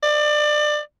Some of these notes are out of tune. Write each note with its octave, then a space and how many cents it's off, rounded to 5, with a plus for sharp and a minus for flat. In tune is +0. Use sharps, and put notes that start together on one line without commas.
D5 +25